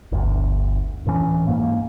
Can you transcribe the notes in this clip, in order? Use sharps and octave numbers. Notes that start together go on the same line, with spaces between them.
G1 D2
D1 A2 E3 C#4
G#2 A#3